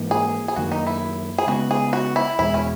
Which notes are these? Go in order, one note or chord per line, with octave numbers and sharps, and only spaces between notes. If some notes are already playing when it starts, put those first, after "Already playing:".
Already playing: G#2 E3 A#3
G#4
G#4
F#2 D#3 A#3 F#4
D#4
E4
G#4
C#3 G#3 B3 F#4
G#4
F#4
E4
E2 B2 G#3 E4
C#4